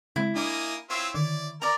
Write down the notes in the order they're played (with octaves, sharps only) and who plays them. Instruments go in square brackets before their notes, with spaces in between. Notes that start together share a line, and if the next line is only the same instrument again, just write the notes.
[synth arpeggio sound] C#3 G#3 C4 [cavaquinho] E4
[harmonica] A#3 D#5 G#5 [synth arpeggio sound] D4 D6
[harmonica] C4 F4 E5 [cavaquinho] E4 C#5 [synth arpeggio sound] C6
[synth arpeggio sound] D3 D#3 [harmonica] D5
[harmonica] A#4 [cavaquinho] D5 A#5